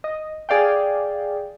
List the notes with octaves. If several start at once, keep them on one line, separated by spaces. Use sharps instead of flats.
D#5
G#4 D5 F5 G5